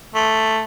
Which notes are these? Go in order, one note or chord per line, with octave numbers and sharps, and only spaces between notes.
A3